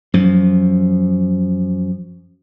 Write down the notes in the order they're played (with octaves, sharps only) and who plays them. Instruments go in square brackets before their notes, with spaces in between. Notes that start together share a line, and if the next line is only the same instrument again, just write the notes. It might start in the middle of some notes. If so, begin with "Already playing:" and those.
[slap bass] F#2 F3